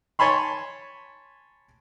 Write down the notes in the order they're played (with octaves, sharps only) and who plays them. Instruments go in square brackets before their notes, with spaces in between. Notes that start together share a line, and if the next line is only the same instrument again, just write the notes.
[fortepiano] C#5 G#5 A5 B5 C6